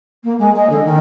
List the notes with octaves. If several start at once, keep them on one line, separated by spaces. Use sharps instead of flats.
A#3
G#3
D#5
D3
D#3